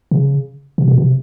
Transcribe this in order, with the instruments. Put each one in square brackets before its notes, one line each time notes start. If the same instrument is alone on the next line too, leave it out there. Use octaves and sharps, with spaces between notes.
[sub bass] C3
C#3
C3
B2
C3